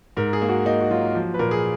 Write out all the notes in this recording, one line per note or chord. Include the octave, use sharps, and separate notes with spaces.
G#2 A#4
G#4
A#3
F#4
A#3 D#4
F#4
F#3 F4
F3
B4
A#2 A#4
G#4